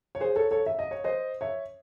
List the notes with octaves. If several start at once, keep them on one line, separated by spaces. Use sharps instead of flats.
C#5
G#4 C5
A4 C#5
A4 C#5
E5
D#5
C#5
C5 D#5
C#5 E5